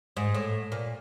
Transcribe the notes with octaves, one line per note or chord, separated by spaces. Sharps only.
G#2
A2
A#2